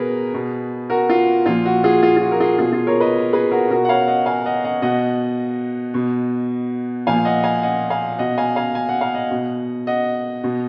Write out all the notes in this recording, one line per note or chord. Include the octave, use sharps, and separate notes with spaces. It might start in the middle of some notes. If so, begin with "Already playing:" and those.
Already playing: B2 G#4 A#4 B4
B2
F#4 A#4
F4
A#2 F3 F4
F#4
F4 G#4
F4
F4
F#4
A#4
F4 G#4
B2 F4 G#4
F4 G#4
A#4 C#5
B4 D#5
G#4 B4
F#4 A#4
B2 F#4 A#4
F#5
C#5 F5
D#5 F#5
F5 G#5
D#5 F#5
D#5 F#5
B2 D#5 F#5
B2
A#2 F3 F5 G#5
D#5 F#5
F5 G#5
D#5 F#5
F5 G#5
B2 D#5 F#5
F5 G#5
F5 G#5
G#5
F#5
F5
D#5 F#5
B2
D#5 F#5
B2